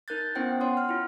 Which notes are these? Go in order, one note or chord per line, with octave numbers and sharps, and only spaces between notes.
D#4 A#4 F#6 G6 A6
B3 C#4 E4 C5 F#5 G5
C#5 F#5 C6 D#6
F6
E4 F4